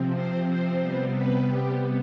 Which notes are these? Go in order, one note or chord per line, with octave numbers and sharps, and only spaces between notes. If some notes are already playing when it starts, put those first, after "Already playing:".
Already playing: C3 F3 C4
C5
C5
C3 G3 B3
B4
G4